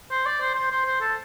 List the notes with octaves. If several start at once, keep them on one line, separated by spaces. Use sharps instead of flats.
C5
D5
C5
C5
C5
C5
A4